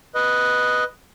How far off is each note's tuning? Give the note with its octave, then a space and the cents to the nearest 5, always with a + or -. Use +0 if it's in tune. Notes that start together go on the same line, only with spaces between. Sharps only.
B4 +0 D#5 +0